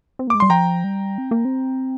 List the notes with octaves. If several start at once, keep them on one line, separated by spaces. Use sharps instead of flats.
C4
A#3
G#3 D6
G3 C6
F3 G5 A#5
G3
C4
A#3
C4